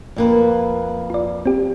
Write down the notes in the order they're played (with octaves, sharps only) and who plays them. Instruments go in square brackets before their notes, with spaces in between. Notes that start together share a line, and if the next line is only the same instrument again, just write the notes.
[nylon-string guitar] F2 A#3 B4
[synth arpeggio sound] F4 D5
C4 G4